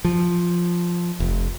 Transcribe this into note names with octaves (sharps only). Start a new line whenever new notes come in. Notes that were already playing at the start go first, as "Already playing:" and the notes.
F3
F1